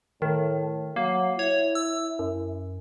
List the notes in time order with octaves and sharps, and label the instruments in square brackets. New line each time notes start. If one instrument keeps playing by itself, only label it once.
[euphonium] A2 [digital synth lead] D#3
[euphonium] F#3 [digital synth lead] A#3
[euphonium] E4 [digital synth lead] C#5
[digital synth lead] E6
F#2